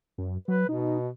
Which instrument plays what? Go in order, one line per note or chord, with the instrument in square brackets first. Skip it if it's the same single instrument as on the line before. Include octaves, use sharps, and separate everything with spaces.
[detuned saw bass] F#2
[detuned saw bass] F#3 [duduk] B4
[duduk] B2 [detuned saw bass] D#4